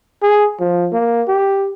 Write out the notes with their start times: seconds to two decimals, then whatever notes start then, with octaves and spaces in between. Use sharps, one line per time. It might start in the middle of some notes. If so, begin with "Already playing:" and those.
0.23 G#4
0.60 F3
0.92 A#3
1.28 G4